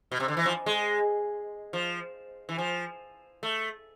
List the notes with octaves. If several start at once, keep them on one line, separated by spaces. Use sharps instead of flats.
B2
C3
D3
E3
F3
G#3
F3
E3
F3
A3